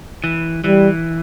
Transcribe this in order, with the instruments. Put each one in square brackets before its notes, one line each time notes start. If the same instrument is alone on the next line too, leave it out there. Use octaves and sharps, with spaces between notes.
[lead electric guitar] E3
[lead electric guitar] E3 [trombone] G3